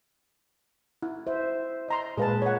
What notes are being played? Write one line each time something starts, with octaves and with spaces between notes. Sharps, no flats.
E4
C5 E5
D#5 A#5 C6
A#2 G#3 G#4 B4 F5 A5
C#5 F#5